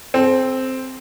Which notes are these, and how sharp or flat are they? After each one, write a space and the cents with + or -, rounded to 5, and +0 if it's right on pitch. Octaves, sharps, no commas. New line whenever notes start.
C4 +0 A4 -45